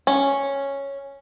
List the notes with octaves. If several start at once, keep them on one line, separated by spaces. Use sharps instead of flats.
C#4